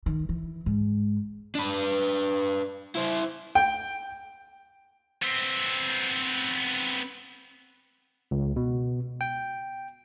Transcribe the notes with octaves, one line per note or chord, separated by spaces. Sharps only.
D#3
E3
G#2
D4 B4
E4 C5
G5
B3 C4
C#2
B2
G5